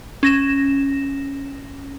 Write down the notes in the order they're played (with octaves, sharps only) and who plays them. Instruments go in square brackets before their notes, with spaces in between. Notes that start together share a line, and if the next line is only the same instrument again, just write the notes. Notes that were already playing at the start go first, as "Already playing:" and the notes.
[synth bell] C#4 A#6 E7